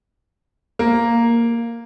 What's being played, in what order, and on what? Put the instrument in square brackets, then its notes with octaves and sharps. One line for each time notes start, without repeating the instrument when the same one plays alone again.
[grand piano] A#3